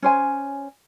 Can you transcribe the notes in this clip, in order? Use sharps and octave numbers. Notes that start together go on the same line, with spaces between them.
C#4 C5 G#5